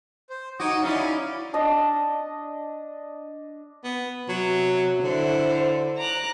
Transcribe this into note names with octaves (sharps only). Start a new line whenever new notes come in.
C5
D#4 F#4 C#5 D6 D#6
C#4 D#4 E4 D5 F5
D4 D#5
B3
C3 F#3
D3 E4 C5
A#5 D6 F#6